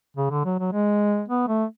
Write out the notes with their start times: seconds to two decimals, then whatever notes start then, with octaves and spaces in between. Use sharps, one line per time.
0.17 C#3
0.30 D3
0.45 F#3
0.59 F#3
0.73 G#3
1.28 B3
1.48 A3